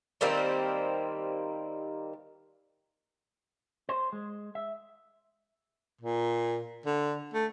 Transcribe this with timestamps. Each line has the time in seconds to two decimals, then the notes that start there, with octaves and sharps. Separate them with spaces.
0.21 D#3 G3 A#3 C4
3.89 C5
4.13 G#3
4.55 E5
6.01 A#2
6.86 D3
7.34 A3